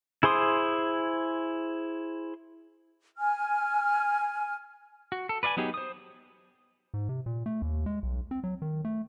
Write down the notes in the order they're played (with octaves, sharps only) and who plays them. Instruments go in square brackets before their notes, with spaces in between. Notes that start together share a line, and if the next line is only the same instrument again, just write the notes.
[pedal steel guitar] E4 G#4 C5 C6 D#6
[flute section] G#5 F6
[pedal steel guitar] F#4
A4
B4 D5 E5 G#5
F#3 B3 D#4 G4 G#4
C5 D#6
[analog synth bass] G#2
C3
A#2
A3
D#2
G#3
B1
C4
F#3
D#3
A3